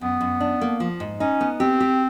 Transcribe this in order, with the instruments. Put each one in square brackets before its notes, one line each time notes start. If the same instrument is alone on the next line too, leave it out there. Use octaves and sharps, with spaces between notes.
[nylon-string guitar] F#2 [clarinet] B3
[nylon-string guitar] F#2
D4
A#3
F3
G#2
[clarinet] C#4 [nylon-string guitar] D#4
[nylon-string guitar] B3
[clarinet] C4 [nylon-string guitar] G4
[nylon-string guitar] G4